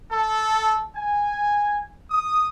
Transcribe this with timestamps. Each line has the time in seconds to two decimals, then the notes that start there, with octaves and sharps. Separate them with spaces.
0.12 A4
0.96 G#5
2.11 D#6